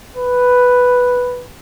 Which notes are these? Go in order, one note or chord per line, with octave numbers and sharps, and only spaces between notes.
B4